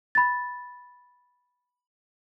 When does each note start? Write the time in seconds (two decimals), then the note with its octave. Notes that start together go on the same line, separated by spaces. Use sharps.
0.15 B5 A6